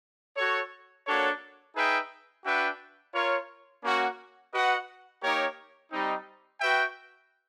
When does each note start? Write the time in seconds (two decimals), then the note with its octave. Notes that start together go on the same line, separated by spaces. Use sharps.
0.36 F#4 A4 C#5
1.06 A#3 D4 F#4 A4 C#5
1.75 D#4 G#4 B4 E5 G5
2.44 D4 F#4 B4 E5 G5
3.13 F4 A#4 C#5
3.82 A#3 C#4 F#4
4.52 F#4 B4 D#5 F#5
5.21 A#3 D#4 G4 A#4 C#5
5.91 G3 C4 D#4
6.59 F#4 B4 E5 G5